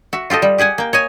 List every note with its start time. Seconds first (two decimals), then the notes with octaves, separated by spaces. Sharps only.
0.13 F#4 E5
0.30 F4 G4 A4 D#5
0.42 G3
0.58 G4 G#4 F#5 G#5
0.78 A#3 G5
0.93 C#5 D#5 G#5